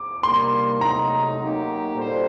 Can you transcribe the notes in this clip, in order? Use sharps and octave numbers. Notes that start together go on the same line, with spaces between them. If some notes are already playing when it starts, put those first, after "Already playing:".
Already playing: D6
C3 D#3 G3 A#3 D4 C6
C3 F#3 A3 D#4 A#5
F#3 A#3 D#4 G4
A#2 G3 D4 A4 C5